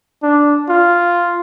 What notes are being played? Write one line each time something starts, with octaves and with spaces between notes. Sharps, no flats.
D4
F4